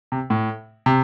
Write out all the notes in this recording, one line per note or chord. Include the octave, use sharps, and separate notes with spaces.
C3
A2
C3